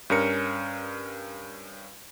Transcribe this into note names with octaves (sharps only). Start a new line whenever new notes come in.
G2 C#4 A#4 C#7